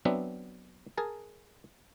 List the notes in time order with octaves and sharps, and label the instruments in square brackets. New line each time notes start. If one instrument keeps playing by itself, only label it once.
[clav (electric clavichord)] F#3 B3 C4 D4 E5
G#4 A#4 A5